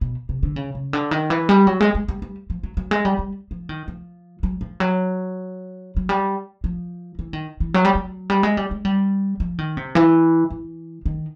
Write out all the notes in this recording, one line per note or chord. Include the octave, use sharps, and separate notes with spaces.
B2
C3
D3
C#3
C#3
D3
D#3
E3
G3
F#3
G#3
G#3
G3
G3
F3
F#3
F#3
G#3
G3
G3
F3
D#3
F3
F#3
F3
F#3
F#3
G3
F3
E3
D#3
E3
F#3
G3
F#3
G3
G#3
G3
G#3
G3
F3
D#3
C3
E3
E3
D#3